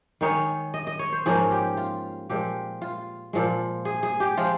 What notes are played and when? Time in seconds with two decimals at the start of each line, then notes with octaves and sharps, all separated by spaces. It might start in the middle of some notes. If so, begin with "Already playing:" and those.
0.21 D#3 G#3 D#4 C#5
0.74 D#5
0.87 D#5
0.99 C#5
1.12 C5
1.26 G#2 F3 A#3 C#4 G#4
1.51 G4
1.77 F4
2.30 A#2 F3 G#3 G4
2.82 F4
3.33 A#2 F3 G#3
3.85 G#4
4.03 G#4
4.20 G4
4.37 F3 G#3 F4